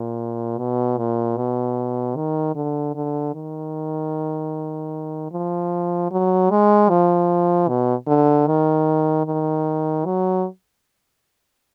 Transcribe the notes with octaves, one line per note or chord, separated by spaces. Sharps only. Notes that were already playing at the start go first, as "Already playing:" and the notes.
Already playing: A#2
B2
A#2
B2
D#3
D3
D3
D#3
F3
F#3
G#3
F3
B2
D3
D#3
D#3
F#3